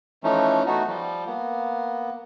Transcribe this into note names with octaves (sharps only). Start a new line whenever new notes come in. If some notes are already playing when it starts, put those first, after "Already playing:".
E3 F3 A3 C#4 D#4
A3 B3 D#4 F#4
F3 G3
A#3 B3